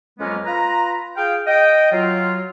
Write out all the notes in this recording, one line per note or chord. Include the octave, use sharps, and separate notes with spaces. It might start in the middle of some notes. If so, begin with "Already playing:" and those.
F2 F#3 G#3 A#3 B3 C#4
F4 B4 A#5
F4 G#4 F5 G5
D#5 G5
F#3 F4